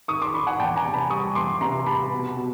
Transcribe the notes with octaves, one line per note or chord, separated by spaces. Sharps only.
D#3 C#6 D#6
C6 D6
D#3 B5 C#6
F#5 G#5
E2 G5 A5
G#5 A#5
C3
A5 B5
G3 C#6 D#6
E2 C6 D6
C3 A#5 C6
C3 A5 B5
B2
B2